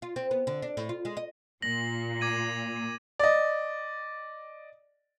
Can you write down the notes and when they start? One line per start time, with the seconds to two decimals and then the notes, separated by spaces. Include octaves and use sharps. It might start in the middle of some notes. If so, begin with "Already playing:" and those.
0.02 F4
0.16 C4
0.31 B3
0.47 D3
0.62 D4
0.77 A2
0.89 F4
1.05 G#3
1.17 D#5
1.62 A#2 A#6 F#7
2.21 D6 G#6 D#7
3.19 D5 D#5